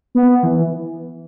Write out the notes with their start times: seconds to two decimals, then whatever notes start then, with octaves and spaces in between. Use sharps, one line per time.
0.15 B3
0.43 E3